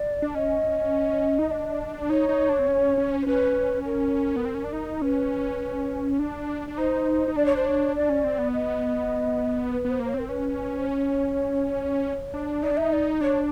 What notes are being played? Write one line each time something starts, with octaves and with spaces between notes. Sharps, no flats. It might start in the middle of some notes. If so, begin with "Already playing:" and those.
Already playing: D5
D4
C#4 D#5
D#4
D4
D#4 C#5
D#4
D4
C4
C#4
C#4
C5
C#4 B4
A#4
B3
C4
C#4
D4
D#4
C#4 B4
D4
D4
D#4 C5
D#4
D4 D5
C#5
C5
C#5
D4 D5
C#4
C4
B3
D#5
B4
B3
C5
A#3
C5
C#5
C4
A#4
C#4 B4
C5
C#5
D4
D#4 D5
D4
D#4 E5
D5
D4 C#5